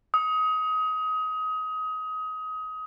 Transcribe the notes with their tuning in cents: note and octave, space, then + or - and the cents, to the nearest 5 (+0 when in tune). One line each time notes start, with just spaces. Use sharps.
D#6 +25